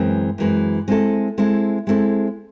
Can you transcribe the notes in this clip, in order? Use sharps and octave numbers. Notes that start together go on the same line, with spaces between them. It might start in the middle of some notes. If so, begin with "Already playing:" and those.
Already playing: F#2 E3 G#3 C4
F#2 E3 G#3 C4
G#3 C4 E4 A4
G#3 C4 E4 A4
G#3 C4 E4 A4